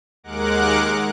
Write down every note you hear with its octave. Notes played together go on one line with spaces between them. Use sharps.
D#2 G#3 A#4 F#5 D6 F#6